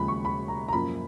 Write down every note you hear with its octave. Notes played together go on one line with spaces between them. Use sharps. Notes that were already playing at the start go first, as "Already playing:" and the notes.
Already playing: D#2 C#3 F3 G#3 B5
C#6
B5
A#5
A#5
F#2 F3 A#3 B5